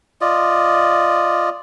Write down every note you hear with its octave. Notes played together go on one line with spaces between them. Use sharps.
F4 D5 D#5